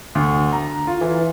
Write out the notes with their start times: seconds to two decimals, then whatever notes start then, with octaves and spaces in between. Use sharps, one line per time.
0.15 D2
0.53 A#5
0.87 F4
1.01 E3